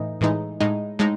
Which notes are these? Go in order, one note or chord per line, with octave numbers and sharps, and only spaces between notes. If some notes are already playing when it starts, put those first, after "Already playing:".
Already playing: A2 E3 D#4
A2 E3 G#3 D#4
A2 G#3 D#4
A2 G#3 D#4